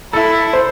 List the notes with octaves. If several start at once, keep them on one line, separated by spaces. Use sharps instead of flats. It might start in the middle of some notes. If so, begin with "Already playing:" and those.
E4 A4
C5